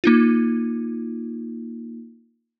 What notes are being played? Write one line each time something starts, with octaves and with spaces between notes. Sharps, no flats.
A#3 D#4 F4